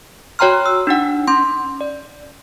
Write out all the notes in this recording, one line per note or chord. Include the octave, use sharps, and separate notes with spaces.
F#4 C#5 G5 A#5 C6 F6
E6
D4 D#4 F#5
C#4 C6
D5